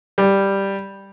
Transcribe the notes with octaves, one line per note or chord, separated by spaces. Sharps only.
G3